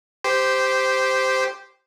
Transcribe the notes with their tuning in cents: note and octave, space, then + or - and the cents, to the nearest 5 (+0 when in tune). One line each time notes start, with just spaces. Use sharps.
G4 +0 C5 -10